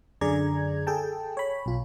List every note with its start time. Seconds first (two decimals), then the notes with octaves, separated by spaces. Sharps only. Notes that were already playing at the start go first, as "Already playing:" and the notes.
0.21 F#2 D3 G#4 D5 A#5 G#6
0.87 G#4 A4 G5 A5
1.37 C#5 B5
1.66 B1 F4